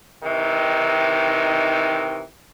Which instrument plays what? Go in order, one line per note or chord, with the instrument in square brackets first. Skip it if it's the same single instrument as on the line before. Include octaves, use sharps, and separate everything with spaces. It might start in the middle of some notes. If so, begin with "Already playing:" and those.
[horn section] C3 D#3 E3 D#4